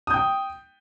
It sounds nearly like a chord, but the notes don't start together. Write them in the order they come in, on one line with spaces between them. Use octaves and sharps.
D#6 G6 G5